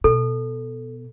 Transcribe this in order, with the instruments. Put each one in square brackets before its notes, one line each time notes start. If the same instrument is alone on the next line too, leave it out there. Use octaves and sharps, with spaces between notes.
[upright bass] B2 [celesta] A4